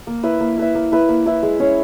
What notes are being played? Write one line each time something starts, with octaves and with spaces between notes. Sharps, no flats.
A#3
E4 B4 E5
A#3
E4 B4 E5
A#3
E4 B4 E5
A#3
E4 B4 E5
G#3
C#4 G#4 C#5